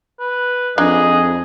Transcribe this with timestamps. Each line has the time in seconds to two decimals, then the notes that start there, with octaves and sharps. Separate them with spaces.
0.19 B4
0.78 F2 D4 D#4 G#4 D#5